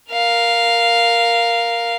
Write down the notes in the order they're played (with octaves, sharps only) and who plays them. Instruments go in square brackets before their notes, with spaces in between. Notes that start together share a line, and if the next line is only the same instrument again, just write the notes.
[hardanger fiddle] A#4 F5